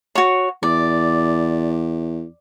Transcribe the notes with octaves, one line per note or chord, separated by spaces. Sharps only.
F#4 C#5
E2 D5